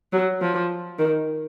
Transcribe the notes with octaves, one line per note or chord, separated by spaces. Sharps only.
F#3
F3
D#3